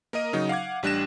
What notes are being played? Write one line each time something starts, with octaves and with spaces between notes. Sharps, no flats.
A#3 A#4 D#5 D#7
C#3 F#3 D#4
F5 F#5 D6 G#6
A1 G3 D4 F#6 A#6 E7